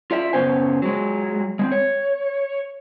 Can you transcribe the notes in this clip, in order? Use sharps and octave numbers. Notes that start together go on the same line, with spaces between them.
F4 D5 E5
F#2 C#3 B3 C#4 C5 G#5
F#3 G#3
G#3 B3 C4
C#5